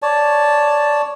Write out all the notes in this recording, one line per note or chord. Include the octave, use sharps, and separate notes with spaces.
C#5 D5 A5